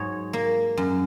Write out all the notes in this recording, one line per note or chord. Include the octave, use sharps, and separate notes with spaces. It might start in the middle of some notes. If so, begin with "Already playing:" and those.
Already playing: G#2 F#3 C#5
A#3
F#2